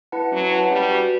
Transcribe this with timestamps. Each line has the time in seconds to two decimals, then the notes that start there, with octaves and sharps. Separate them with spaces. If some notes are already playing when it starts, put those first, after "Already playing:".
0.12 E4 B4 F#5 A5
0.32 F#3 C#4
0.51 E4 B4 F#5 A5
0.71 G3 C#4
0.91 F#4 B4